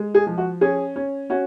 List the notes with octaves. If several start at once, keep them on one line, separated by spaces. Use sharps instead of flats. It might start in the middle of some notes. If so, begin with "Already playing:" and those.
Already playing: G#3
G#4
F3
F#4
C#4 G#4
C#4
C#4 F#4